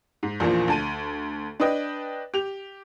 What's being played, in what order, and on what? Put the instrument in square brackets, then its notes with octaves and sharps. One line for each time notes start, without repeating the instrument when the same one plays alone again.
[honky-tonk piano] G#2
A#1 E2 A#2 F3
D2 A5 D#7
D4 B4 D#5 G5
G4 F7